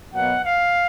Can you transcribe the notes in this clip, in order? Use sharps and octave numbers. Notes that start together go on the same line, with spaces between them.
B2 F#3 A#3 F#5
F5